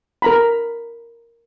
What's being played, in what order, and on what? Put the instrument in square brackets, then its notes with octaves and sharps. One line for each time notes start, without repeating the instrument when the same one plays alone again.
[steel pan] A#4 A#5 B5